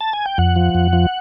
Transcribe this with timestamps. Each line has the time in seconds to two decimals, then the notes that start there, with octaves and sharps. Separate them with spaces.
0.01 A5
0.13 G#5
0.26 G5
0.38 F2 F#5
0.56 F3
0.75 F2
0.93 F3